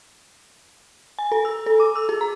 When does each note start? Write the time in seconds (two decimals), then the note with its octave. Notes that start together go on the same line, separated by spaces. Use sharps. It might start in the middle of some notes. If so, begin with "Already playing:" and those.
1.19 G#5
1.32 A4
1.45 E6
1.66 A4
1.80 D6
1.96 E6
2.09 G#4
2.21 A#5